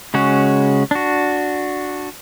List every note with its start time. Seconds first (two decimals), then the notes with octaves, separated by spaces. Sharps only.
0.14 C#3 G#3 C#4 F#4
0.91 D4 F#4